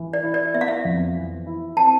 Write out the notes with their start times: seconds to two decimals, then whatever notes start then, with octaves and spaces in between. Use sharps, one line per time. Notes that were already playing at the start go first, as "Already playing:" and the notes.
Already playing: E3
0.13 D5
0.23 E4
0.34 D5
0.54 B3 E5
0.61 F5
0.68 E5
0.85 F2
1.16 E3
1.46 E4
1.76 C4 A5